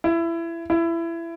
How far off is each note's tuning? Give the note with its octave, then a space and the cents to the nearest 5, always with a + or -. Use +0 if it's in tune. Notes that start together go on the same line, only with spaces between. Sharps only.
E4 +20
E4 +20